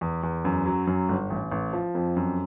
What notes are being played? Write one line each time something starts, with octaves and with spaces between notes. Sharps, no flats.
E2
E2
F#2
F#3
F#2
G1
A1
A1
F3
F2
F#2